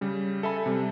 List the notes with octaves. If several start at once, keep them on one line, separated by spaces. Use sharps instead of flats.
C#3 G3
A4 E5 G#5 B5
C3 G3